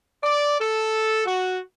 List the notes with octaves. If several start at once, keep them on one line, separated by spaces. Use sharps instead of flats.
D5
A4
F#4